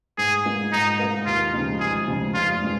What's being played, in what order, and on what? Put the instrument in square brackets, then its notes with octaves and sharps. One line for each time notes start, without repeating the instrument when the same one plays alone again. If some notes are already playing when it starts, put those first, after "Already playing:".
[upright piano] G#2 [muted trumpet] G#4
[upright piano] G#3 F4 A#4
[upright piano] G#2 [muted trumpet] D#4
[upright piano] G#3 F4 A#4
[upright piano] D#2 [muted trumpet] F4
[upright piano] C#3 F3 G#3 D#4
[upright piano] D#2 [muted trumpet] G#4
[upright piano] C#3 F3 G#3 D#4
[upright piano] F1 [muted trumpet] F4
[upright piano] F3 G#3